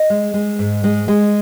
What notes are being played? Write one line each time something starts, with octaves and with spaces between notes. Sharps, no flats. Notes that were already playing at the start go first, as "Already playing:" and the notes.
Already playing: D#5
G#3
G#3
G#2
G#3
G#3